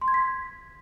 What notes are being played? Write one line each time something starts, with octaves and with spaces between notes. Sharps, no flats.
C6
G#6
B6